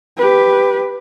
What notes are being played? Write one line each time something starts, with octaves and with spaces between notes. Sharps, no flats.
G4 B4